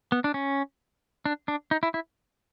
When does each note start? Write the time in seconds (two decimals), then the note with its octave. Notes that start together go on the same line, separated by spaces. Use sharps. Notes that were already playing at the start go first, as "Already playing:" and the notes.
0.12 B3
0.24 D4
0.34 C#4
1.26 D4
1.48 D4
1.71 D#4
1.83 E4
1.94 E4